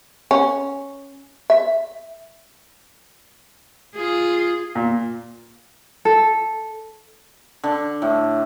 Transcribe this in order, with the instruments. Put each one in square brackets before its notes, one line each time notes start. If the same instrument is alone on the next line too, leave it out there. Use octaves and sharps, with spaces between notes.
[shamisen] C#4
E5
[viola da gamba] F4 G#4
[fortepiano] A#2
[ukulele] A4
[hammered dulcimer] D3
A2